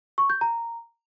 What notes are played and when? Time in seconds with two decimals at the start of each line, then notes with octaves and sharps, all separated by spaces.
0.18 C#6
0.30 G6
0.41 A#5